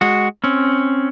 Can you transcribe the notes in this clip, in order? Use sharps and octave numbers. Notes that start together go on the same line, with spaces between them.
G#3 F#4
C4 C#4